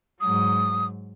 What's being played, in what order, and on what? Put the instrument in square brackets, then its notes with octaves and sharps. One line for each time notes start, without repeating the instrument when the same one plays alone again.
[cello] G#2 F#3 [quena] D#6